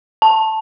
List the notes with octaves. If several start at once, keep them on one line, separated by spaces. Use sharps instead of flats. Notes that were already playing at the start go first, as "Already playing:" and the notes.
A5